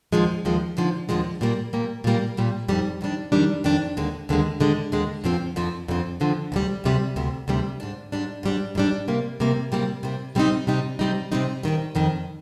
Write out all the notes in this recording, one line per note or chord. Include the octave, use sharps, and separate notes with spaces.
D#2 D3 F3 G#3
D#2 D3 F3 G#3
D#2 D3 F3 G#3
D#2 D3 F3 G#3
A#2 G3 A#3
A#2 G3 A#3
A#2 G3 A#3
A#2 G3 A#3
F2 D#3 G3 D4
F2 D#3 G3 D4
F2 D#3 G3 D4
F2 D#3 G3 D4
D#2 D3 G#3
D#2 D3 G#3
D#2 D3 G#3
D#2 D3 G#3
F2 D3 F3 C4
F2 D3 F3 C4
F2 D3 F3 C4
F2 D3 F3 C4
D2 C3 G3
D2 C3 G3
D2 C3 G3
D2 C3 G3
G#2 G3 D4
G#2 G3 D4
G#2 G3 D4
G#2 G3 D4
C3 G3 A#3
C3 G3 A#3
C3 G3 A#3
C3 G3 A#3
C3 G3 C4 D#4
C3 G3 C4 D#4
C3 G3 C4 D#4
C3 G3 C4 D#4
F2 D#3 G3
F2 D#3 G3